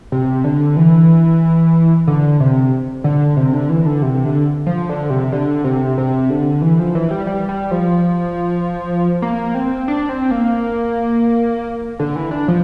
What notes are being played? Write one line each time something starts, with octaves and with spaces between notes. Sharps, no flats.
C3
D3
E3
D3
C3
D3
C3
D3
E3
D3
C3
D3
F3
D3
C3
D3
C3
C3
D3
E3
F3
E3
G3
G3
G3
F3
A#3
C4
D4
C4
A#3
D3
E3
D4
F3